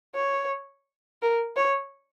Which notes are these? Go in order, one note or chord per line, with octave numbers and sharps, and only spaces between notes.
C#5
A#4
C#5